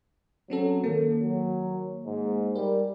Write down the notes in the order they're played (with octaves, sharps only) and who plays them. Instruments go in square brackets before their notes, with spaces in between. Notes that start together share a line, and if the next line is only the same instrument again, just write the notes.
[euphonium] F#3 [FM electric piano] C4 C#4 A4
[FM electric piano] D#3 A#3 [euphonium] A4
[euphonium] F#3
G#2
[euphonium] G3 [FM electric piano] A#4